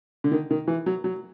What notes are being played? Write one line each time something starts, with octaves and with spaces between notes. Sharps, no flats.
D3
D#3
D#3
E3
F#3
F#3